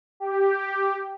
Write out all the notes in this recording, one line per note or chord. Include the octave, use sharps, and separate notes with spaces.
G4